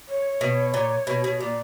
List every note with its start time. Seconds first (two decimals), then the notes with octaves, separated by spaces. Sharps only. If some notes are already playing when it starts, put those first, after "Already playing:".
0.08 C#5
0.41 B2
0.74 A#2
1.07 B2
1.24 B2
1.40 A#2 D5